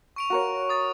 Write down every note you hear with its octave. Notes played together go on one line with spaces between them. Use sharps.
C#6 D7 F7
F#4 A#4 C#5
D#6 A6